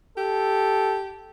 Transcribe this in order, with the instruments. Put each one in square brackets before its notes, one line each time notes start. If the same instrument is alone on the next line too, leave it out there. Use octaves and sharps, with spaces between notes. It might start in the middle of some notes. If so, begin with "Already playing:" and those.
[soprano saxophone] G4 [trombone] A4